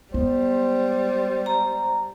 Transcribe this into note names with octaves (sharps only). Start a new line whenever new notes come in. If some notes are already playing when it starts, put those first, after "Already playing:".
G3 G#3 B3 C5
A#5